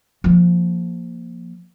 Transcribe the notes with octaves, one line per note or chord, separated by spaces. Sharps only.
F3 A#3